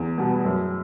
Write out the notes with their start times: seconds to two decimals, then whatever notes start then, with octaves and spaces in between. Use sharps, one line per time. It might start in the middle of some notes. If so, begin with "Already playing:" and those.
Already playing: E2
0.18 B2 G3 B3
0.45 F#2